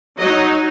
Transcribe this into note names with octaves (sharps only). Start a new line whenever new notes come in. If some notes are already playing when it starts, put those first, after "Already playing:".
F#3 D#4 D#5